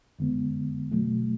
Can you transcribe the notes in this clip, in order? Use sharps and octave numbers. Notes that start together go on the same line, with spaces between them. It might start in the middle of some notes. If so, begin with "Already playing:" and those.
F2 D3 G#3 B3
B2 F#3 A3